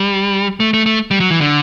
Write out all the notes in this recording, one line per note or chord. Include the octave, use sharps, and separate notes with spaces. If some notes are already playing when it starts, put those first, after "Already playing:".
Already playing: G3
A3
A3
A3
G3
F#3
E3
D3